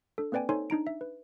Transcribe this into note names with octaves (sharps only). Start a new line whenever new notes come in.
D4 A4
A#3 C4 B4 D5 G5 G#5
D#4 A4 C5 C#5 G#5 C6
D4 D#4 A#5 D7
E5
B4